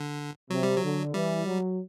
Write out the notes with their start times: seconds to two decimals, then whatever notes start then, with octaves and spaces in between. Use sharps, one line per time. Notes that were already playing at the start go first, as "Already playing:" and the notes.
Already playing: D3
0.50 C3 F#3
0.63 G3
0.76 F#3
0.83 D3
1.14 E3 G3
1.46 F#3